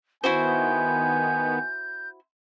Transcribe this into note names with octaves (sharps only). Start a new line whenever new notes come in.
D#3 B3 E4 F#4 C5 G#5 G6